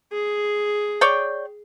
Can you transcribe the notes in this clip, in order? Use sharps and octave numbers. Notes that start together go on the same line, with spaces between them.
G#4
C#5 D5 G5